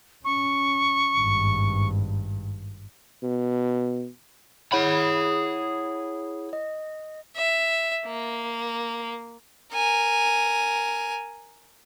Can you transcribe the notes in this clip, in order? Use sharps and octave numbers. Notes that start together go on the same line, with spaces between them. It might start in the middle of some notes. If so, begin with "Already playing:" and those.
C#4 C#6
G#1 G2
B2
E4 G#4 C#5 F#5 B5
D#5
E5
A#3
A#4 G#5